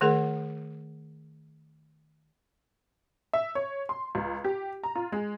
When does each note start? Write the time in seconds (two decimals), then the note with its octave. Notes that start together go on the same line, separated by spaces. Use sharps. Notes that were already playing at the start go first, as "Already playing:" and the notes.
0.01 D#3 A3 G#4 A#4 F#5
3.33 E5
3.55 C#5
3.89 C6
4.15 C#2
4.44 G4
4.83 A#5
4.96 F4
5.12 G#3